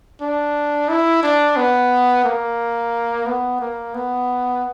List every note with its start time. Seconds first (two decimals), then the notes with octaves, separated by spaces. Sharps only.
0.21 D4
0.89 E4
1.23 D4
1.56 B3
2.25 A#3
3.26 B3
3.61 A#3
3.94 B3